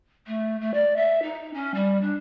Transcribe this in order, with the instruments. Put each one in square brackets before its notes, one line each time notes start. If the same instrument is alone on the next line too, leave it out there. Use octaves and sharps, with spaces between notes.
[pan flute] A3
A3
D5
E5
D#4
C#4
G3
D4